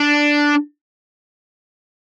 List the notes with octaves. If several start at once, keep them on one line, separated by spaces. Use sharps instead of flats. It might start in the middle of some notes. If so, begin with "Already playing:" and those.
Already playing: D4